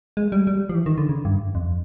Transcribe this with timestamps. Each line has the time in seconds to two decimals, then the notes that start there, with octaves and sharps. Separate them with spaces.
0.17 G#3
0.32 G3
0.47 G3
0.69 F3
0.75 E3
0.86 D#3
0.98 D3
1.09 C#3
1.25 G2
1.55 F2